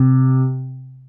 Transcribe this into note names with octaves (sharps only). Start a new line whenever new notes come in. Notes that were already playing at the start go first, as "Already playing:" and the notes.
Already playing: C3